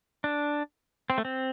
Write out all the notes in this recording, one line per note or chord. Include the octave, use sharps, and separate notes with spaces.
D4
C4
A3
C4